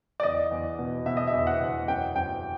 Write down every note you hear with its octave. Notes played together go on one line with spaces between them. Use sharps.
D5
E2 D#5
E2
B2
B2 E5
D#5
E5
E2
F#5
E2
F#2 G5
F#2 G5